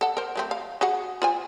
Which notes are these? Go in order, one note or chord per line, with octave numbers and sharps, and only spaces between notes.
A4 F#5
A#4 C5
F#3 A3 C4
F5
F#4 G#4 F#5
F4 C5 G#5